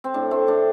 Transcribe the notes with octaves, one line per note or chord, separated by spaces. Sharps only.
C4
A2 D4
A3 C4
A2 D4